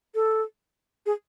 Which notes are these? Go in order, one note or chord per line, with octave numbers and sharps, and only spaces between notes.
A4
G#4